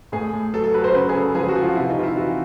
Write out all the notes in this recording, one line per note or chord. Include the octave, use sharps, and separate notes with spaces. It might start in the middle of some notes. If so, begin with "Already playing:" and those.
A2 G#4
A2
F#3 A4
A4
F#3 B4
C5
C#3 B4
G#4
C#3 A4
F3 G#4
F#4
F3
F4
C3 E4
D#4
C3 F4
E4
E3 F#4